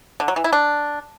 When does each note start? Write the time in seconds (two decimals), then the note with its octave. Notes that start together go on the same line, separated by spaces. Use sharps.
0.20 D3
0.28 F#3
0.36 E3
0.44 E4
0.53 D4